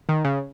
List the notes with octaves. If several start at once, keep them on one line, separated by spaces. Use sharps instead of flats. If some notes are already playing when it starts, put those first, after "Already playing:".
D#3
C#3